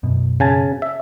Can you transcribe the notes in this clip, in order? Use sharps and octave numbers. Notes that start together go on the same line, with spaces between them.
F#2 B2
C#3 G#5 A5
E5